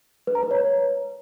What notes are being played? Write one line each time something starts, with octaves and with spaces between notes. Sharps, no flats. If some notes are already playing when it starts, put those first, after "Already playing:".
B4
A#5
B4
C#5